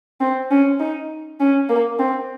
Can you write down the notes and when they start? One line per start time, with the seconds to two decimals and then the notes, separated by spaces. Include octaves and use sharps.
0.21 C4
0.51 C#4
0.80 D#4
1.40 C#4
1.69 A#3
1.99 C4